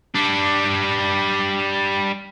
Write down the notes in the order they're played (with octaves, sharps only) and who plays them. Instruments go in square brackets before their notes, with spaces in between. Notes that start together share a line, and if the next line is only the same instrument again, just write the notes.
[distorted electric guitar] G3 D4